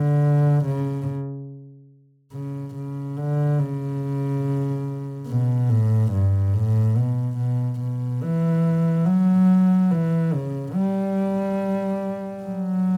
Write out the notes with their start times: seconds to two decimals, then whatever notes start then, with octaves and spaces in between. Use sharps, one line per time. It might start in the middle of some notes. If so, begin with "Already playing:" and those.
Already playing: D3
0.65 C#3
2.32 C#3
2.75 C#3
3.17 D3
3.59 C#3
5.27 B2
5.70 A2
6.12 G2
6.54 A2
6.96 B2
7.38 B2
7.80 B2
8.22 E3
9.06 F#3
9.91 E3
10.33 C#3
10.74 G3
12.43 F#3